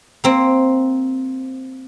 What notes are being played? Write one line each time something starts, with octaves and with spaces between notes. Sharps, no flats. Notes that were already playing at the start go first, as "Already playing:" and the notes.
A#3 C4